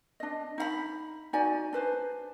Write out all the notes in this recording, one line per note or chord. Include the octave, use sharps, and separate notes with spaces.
D4 D#5
D#4 F5 B5
D#4 F#4 D5 G#5
D4 B4 C5